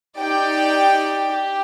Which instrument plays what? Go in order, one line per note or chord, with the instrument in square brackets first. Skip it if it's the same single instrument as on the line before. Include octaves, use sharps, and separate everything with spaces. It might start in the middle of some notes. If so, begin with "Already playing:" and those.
[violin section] D#4 G4 D5 G5
G4